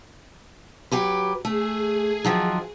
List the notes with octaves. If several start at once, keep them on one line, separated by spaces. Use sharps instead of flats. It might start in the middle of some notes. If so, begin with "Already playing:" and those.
F#3 G4 B4
A3 G#4
D#3 F3 F#3